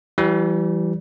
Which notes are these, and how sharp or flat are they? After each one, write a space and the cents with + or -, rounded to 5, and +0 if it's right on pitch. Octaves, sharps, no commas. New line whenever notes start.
E3 +20 G3 -20